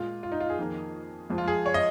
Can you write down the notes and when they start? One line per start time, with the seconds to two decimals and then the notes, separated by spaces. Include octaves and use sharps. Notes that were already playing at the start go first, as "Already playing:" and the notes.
Already playing: A#2 G#3 F4
0.23 F4
0.32 D#4
0.40 F4
0.50 G#4
0.59 F2 D#3 A#3
1.30 F2 F3 G#3
1.38 F4
1.48 G#4
1.66 C#5
1.74 D#5